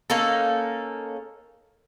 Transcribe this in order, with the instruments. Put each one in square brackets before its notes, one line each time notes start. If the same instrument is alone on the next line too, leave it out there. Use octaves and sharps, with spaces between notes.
[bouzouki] A#3 C#4 D#4 A4